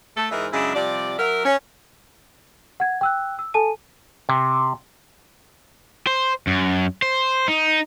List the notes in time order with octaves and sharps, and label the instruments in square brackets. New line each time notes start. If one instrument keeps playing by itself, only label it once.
[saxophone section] A3 A4
G#2 E3 G#3 A#4 D#5 E5
F#2 C#3 G#3 D4 E4
C3 F3 G3 D5
F#3 A#4 E5
C#4
[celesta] F#5 G#6
G5 E6 F#6
E6
A4 G#5 A5 D#7
[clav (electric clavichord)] C3
[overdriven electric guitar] C5
F#2
C5
D#4